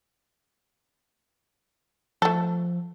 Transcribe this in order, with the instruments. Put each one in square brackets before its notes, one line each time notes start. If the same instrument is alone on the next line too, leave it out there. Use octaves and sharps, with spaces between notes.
[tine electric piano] F3 [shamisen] A3 A4